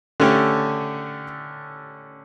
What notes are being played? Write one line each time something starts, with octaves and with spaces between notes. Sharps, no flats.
D3 A3 C#4 G4